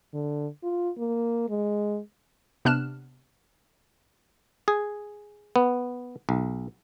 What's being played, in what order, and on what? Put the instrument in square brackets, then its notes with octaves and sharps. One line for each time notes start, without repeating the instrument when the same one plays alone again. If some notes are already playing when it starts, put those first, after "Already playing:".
[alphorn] D3
F4
A#3
G#3
[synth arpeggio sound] C3 B3 D4 F6 F#6 E7
[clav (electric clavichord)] G#4
B3
B1